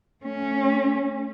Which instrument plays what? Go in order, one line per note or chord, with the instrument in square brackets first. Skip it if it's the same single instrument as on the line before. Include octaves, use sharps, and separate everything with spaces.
[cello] A3 C#4